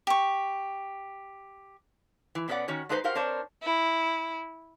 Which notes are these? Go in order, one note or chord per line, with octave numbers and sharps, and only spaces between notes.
G4 C#6
E3
B2 B3 C#4 A4 D5 F#5
D#3 C#4 F#4 C#5
G#3 D4 D#4 B4 C5 A#5
F#4 G4 A#4 C5 F5 F#5
C4 D4 A#4 C5 C#5
E4